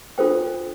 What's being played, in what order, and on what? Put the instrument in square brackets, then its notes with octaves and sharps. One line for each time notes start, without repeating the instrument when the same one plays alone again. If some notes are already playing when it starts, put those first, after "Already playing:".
[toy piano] D4 F4 A4 C5 G5